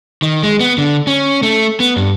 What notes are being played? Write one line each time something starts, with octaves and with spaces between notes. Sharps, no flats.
D#3
G#3
B3
D3
C#4
A3
B3
G2